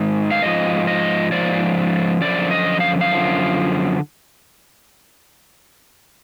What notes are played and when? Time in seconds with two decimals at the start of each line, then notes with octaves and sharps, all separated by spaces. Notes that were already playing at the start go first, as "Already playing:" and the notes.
Already playing: G#2 D#3
0.31 F5
0.42 G#2 F3 D#5
0.87 D#5
1.32 G#2 F3 D5
2.21 F#2 D3 F3 D5
2.51 D#5
2.80 F5
3.01 F5
3.11 F#2 D3 F3